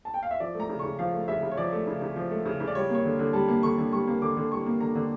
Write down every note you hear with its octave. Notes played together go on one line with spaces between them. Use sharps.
A5
G5
F5
E5
F3 D5
A3
A#5
C#3
C#3 C#6
F3 F5
A3
C#3 E5
C#3
C#5
F3 D5
A3
C#3
C#3
F3
A3
C#3
C#3
D5
G3 C#5
A#3 C#5
D3
D3
G3 A5
A#3
D3 C#6
D3
G3 C#6
A#3
D3 D6
D3
G3 C#6
A#3
D3 A#5
D3